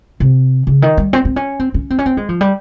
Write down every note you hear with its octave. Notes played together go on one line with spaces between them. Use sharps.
C3
C#3
D#3
G3
C4
C4
C#4
C4
C#4
C4
C#4
C4
G#3
F3
G3